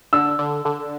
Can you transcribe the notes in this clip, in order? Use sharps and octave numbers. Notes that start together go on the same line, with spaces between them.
D3 E6
D3
D3